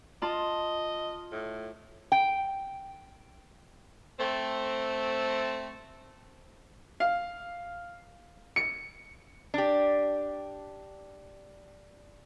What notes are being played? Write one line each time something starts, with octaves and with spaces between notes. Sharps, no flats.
F4 D#5 A5
A2
G5
A3 C4
F5
C#7
D4 G4